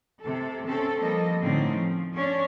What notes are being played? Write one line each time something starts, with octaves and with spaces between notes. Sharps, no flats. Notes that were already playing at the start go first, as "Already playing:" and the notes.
C3 A4
C4 C#4 A4
F3 G3 A#3 A4 D#5
A2 D3 C4 C#4 D#4
F3
C#4 D4